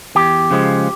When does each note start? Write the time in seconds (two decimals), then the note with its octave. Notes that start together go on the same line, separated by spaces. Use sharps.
0.15 E2 G4
0.51 C#3 F3 G#3